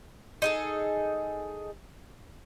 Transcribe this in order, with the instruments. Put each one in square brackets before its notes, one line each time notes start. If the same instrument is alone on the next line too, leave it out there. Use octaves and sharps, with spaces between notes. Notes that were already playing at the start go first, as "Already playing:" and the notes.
[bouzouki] D#4 G#4 A4